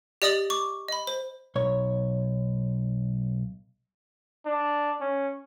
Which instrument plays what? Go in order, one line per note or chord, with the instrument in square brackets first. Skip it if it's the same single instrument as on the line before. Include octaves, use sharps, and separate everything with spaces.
[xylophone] G4 D5 D#5 D#6 A6 F#7
C#6 D6
D#5 B5
C5
[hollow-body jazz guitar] B1 C#5
[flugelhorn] D4
C#4